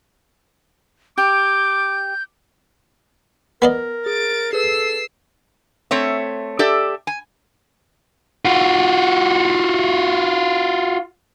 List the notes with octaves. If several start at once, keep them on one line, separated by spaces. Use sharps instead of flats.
G4 D6 G6
B3 A#4 D5 D#5
G#4 A6 D7
G#4 A4 B4 E6 C7
A3 C4 C#5 E5
G4 A4 D5 E5
G#5
F4 F#4